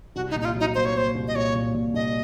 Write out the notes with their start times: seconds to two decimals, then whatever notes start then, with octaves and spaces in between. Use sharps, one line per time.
0.15 C2 F#4
0.31 D#4
0.36 A#2
0.41 D#4
0.45 F4
0.55 F#3
0.60 D#4
0.75 A#3 C5
0.85 C#5
0.94 A#3 C5
1.15 C2
1.28 D#5
1.35 A#2 C#5
1.55 A#2
1.74 A#2
1.94 C2 D#5